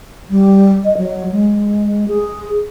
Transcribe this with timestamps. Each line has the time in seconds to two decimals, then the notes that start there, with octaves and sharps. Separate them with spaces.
0.30 G3
0.85 D#5
0.97 F#3
1.32 G#3
2.08 G#4